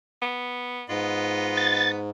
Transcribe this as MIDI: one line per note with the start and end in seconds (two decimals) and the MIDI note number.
0.22 0.84 59
0.89 2.10 44
0.89 1.98 59
0.89 1.86 65
0.89 1.98 75
1.57 1.92 93